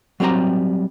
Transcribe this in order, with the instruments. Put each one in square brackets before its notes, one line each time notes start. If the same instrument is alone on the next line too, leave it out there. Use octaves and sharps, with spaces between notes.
[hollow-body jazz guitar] F#3 G3 C4 G4 A#5